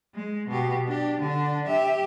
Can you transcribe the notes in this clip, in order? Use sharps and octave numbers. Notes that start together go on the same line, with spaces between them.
G#3
B2 G4
D4 G4
D3 D4
G4 E5